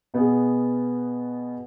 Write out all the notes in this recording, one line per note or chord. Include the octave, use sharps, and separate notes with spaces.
B2 B3 G#4